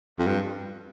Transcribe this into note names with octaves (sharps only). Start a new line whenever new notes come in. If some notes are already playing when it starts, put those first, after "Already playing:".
F2
G2